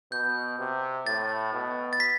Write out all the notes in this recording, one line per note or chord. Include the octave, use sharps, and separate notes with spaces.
B2 G6
C3
A2 A6
B2
A6
B6